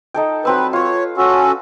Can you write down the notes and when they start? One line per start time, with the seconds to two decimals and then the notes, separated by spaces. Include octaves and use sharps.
0.14 D#4 A4 G5
0.45 F#3 C4 B4 E6
0.73 F4 B4 C#5
1.17 C#4 F#4 A4